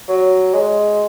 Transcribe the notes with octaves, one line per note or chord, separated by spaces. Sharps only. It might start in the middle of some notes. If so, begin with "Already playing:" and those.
F#3
G#3